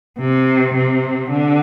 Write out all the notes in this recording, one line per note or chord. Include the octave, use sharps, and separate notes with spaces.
C3
C3
D3